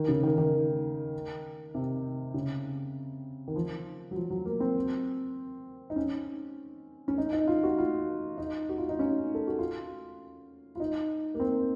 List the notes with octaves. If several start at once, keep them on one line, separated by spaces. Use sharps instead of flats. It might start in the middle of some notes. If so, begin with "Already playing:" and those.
Already playing: D#3
C#3
D#3
D#3
C3
C#3
D#3
F3
F#3
F3
F#3
A#3
C4
D#4
C#4
C#4
D#4
D#4
F4
F#4
F4
D#4
F#4
F4
D#4
C#4
A4
F#4
F4
F4
D#4
A#3
C4